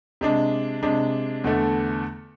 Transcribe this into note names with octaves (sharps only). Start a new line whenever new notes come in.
C3 G#3 D4
C3 G#3 D4
E2 D3 A3